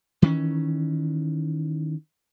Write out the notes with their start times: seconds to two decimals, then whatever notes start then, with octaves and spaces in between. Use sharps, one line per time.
0.22 D#3 E3 A#3 C#4